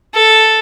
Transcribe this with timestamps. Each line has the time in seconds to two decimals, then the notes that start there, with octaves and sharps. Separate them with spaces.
0.14 A4